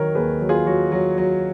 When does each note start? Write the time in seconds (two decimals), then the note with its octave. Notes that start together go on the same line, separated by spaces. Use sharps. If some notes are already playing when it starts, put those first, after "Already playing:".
Already playing: D#3 F#3 A#4 C#5
0.15 D#2 G#4 B4
0.41 F#3
0.49 F4 G#4
0.67 F#3 F#4
0.92 F#3
1.18 F#3